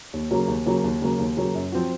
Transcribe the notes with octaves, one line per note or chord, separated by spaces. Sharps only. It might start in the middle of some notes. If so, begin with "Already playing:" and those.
D#2
C#3 F#3 A#3
D#2
C#3 F#3 A#3
D#2
C#3 F#3 A#3
D#2
C#3 F#3 A#3
F#2
F3 C4 F#4